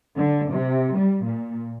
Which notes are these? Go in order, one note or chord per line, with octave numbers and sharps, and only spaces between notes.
D3
C3
G3
A#2